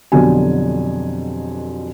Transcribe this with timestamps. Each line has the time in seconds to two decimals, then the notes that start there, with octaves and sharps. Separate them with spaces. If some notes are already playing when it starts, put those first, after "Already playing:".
0.12 F2 B2 D3 F#3 G4 G#5